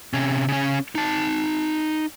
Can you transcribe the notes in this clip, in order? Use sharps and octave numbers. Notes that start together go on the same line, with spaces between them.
C3 C#4
C#3 C#4
D#4 A5